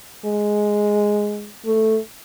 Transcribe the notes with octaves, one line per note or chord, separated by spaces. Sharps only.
G#3
A3